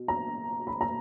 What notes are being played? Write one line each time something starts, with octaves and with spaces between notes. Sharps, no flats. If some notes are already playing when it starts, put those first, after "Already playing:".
Already playing: B2
A#5
B5
A#5